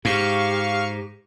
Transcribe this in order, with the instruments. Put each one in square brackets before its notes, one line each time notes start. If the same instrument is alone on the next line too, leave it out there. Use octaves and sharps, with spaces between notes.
[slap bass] G#2 [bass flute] G4 [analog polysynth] F5 C#6